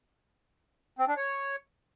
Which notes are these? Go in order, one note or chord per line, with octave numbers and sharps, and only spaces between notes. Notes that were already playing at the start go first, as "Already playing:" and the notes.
C4
D4
C#5